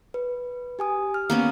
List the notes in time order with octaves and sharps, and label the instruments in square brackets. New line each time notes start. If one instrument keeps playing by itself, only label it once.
[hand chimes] B4
G4 G#5 D#6
F6
[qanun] A#3 B3 C#4